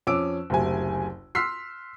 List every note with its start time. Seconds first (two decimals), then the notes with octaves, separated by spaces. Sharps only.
0.07 F2 C#4 D6 E6 D7
0.50 F#1 D2 C3 G#5
1.35 C6 E6 F6 B6 C7